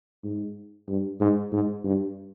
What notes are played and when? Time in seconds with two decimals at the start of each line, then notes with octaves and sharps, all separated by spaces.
0.24 G#2
0.88 G2
1.20 G#2
1.52 G#2
1.84 G2